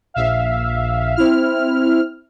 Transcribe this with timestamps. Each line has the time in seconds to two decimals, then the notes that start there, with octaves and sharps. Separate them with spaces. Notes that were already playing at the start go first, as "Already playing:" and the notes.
0.14 A#1 E5 F5
1.15 C4 E4 F6